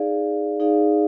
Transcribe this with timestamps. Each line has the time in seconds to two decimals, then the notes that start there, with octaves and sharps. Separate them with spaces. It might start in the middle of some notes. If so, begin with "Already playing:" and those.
Already playing: D#4 G#4 D5 F5
0.60 D#4 G#4 D5 F5